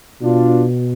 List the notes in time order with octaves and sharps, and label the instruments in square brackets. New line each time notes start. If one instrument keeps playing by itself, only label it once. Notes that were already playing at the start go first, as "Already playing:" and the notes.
[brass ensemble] B2 D4 F4